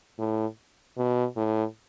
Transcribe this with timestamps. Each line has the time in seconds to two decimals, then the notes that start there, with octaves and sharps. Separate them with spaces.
0.19 A2
0.98 B2
1.36 A2